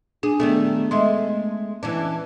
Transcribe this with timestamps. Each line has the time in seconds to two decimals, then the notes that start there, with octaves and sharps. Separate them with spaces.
0.23 D4 G#4
0.40 D#3 G3 A3 B3
0.91 G#3 A3 D#5 E5 C6
1.83 E3 C#4 D4